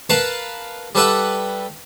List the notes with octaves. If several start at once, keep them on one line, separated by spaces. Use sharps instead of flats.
A#4 B4 F5 F#5 A5
G3 A4 B4 E5 F#5